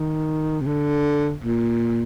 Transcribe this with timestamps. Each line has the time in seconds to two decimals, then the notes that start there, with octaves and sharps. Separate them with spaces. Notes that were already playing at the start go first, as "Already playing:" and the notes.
Already playing: D#3
0.61 C3
0.66 D3
1.44 A#2